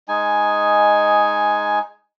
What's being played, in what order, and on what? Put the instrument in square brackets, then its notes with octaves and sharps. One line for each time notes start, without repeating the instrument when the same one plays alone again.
[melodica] G#3 D#4 G#5